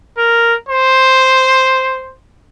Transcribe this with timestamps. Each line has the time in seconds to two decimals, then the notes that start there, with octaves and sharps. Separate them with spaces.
0.18 A#4
0.69 C5